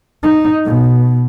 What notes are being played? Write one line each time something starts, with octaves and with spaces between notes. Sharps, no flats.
D#4
B2